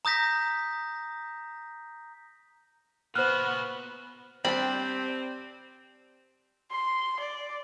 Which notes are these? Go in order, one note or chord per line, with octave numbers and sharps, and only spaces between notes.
A#5 D#6 G6 A#6 B6
A#2 B3 F#4 C5 F6 F#6
G3 C4 D4 G4 C5 G5 B5
C6
D5